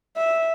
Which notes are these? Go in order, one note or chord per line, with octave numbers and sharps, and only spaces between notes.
E5